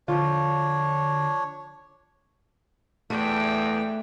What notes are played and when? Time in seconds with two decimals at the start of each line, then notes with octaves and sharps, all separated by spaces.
0.08 D3 F3 D4 F4 C#5
3.10 E2 A3 D4 G5